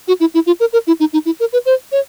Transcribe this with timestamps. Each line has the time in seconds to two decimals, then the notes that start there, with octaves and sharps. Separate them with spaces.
0.08 F#4
0.20 E4
0.34 E4
0.46 F4
0.60 A#4
0.73 A#4
0.87 E4
1.00 D#4
1.13 D#4
1.26 E4
1.40 A#4
1.53 B4
1.66 C5
1.92 C#5